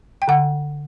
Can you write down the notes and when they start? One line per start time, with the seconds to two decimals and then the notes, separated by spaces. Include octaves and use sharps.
0.22 G5
0.28 D3 F#5